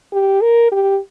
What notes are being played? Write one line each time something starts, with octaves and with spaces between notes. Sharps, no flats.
G4
A#4
G4